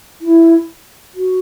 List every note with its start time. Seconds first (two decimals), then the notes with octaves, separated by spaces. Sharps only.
0.21 E4
1.14 F#4